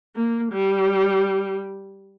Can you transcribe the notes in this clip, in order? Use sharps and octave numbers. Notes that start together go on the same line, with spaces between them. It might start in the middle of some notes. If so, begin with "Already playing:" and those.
A#3
G3